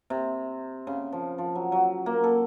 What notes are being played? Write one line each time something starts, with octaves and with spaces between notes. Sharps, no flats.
C3
C#3
F3
F3
F#3
F#3
A#3
A4